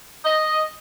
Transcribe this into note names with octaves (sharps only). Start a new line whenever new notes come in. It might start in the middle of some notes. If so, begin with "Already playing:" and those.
D#5